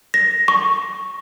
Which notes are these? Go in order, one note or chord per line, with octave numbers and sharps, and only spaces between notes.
A#6
C#6